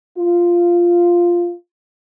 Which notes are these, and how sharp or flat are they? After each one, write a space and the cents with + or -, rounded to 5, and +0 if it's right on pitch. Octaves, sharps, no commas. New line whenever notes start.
F4 -5